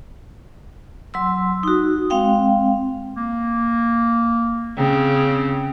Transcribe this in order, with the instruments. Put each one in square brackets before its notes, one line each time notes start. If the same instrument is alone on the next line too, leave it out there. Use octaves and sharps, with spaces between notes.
[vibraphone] F#3 C6 E6
D#4 F#4
G#3 C4 F5 G5
[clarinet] A#3
[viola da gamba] C#3 [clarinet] C4